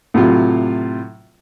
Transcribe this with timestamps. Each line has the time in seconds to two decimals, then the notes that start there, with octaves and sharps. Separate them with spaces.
0.14 A2 C3 F#3 F4